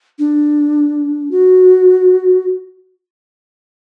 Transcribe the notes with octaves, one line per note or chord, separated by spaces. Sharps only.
D4
F#4